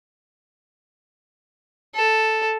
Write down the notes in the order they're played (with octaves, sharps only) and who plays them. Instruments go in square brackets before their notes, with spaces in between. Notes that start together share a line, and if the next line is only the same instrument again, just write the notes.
[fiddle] A4